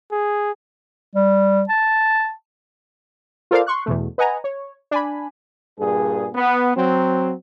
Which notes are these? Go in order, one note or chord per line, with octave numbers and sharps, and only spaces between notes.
G#4
G3
A5
F4 A4 A#4 C5 D5 F5
C6 C#6 F#6
E2 B2 A3
B4 D#5 F#5 G#5 A#5
C#5
D4 G#5 B5
G2 A#2 G#4
B3
F#3 C4